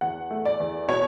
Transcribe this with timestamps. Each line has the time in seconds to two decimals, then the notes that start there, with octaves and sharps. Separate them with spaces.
0.01 E2 F#5
0.31 A3
0.45 D5
0.60 E2
0.88 B2 C#5